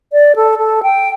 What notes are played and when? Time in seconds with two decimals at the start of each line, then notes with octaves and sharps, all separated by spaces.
0.13 D5
0.36 A4
0.59 A4
0.83 G5